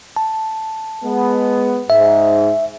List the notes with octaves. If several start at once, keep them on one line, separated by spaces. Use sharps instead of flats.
A5
G#3 B3
G#2 E5